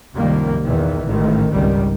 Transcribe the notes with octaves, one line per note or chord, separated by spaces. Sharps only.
C2 F#2 D#3 F3 G3 A#3
E2 A#2 D#3 E3
A1 G#2 D#3
G#1 C#2 D#3 G3